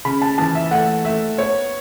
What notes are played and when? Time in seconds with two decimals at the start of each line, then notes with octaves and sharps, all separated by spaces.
0.05 C#3 B5
0.22 A5
0.38 E3 A5
0.55 E5
0.71 A3 F#5
1.04 A3 E5
1.38 B3 C#5